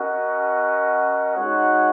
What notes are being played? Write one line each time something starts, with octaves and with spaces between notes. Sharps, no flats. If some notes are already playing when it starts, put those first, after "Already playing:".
Already playing: C#4 F#4 A#4 D#5 F#5
G#3 D#4 F#4 C#5 F#5